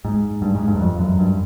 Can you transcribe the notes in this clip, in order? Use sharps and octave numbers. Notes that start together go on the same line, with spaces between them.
G#2
G2
G#2
G2
F#2
F2
F#2
G2